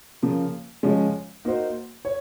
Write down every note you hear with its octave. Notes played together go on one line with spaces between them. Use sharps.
C#3 F3 A#3
C#3 F3 G#3 C#4
A#3 D#4 F#4 C5
C#5